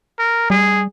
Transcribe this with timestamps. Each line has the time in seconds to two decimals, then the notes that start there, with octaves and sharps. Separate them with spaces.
0.19 A#4
0.50 G3 G#4